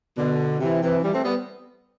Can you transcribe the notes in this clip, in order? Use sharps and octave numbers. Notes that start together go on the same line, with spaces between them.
B2 D3
C3 E3
C3 E3
E3 G3
A3 C4
G3 B3